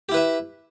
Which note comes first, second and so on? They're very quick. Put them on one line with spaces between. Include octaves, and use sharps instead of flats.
G4 E4 B4 E5